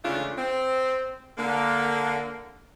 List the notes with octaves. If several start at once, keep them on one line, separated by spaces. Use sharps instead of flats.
C#3 E3 G#3 A3 D4 F4
C4
D3 A#3